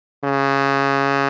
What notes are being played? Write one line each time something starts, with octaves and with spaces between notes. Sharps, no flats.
C#3